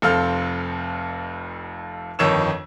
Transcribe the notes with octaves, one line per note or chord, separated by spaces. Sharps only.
F1 F2 C4 A4 F5 F6
G1 F2 D#3 C#5 E6 E7